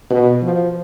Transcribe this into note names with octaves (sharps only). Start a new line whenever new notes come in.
B2
F3